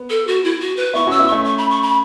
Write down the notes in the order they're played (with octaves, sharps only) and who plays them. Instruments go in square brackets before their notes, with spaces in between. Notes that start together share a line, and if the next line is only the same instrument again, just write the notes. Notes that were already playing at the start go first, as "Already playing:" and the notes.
Already playing: [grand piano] B3
[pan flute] A4
F#4
E4
F#4
B4
[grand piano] B3 E4 [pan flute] C#6
[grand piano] C#4 F#4 [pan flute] E6
[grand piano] B3 E4
[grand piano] A3 C#4 [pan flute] C#6
[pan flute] C#6
B5
C#6
B5